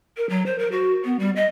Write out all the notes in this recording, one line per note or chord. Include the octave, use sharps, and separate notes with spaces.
A#4
F#3
C5
A#4
F#4
B3
G3
D#5